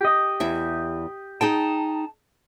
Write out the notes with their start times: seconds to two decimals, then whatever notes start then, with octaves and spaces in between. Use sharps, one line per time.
0.01 G4 D#5
0.40 E2 E4 E5
1.41 D#4 G#4 G5 A5